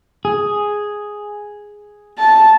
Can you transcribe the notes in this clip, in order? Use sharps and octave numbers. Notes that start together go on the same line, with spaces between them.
G#4
A5